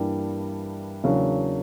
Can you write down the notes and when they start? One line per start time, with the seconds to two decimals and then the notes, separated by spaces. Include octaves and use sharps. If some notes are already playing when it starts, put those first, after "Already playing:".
Already playing: G2 E3 G3 A#3 D4
1.04 E2 C#3 F#3 A#3 D4